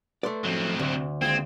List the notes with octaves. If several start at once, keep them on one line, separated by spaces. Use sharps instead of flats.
A3 B4 D5 C6
F2 A2 F3 F#3 C4
D2 C3
D#2 G#3 C4 F4 G#6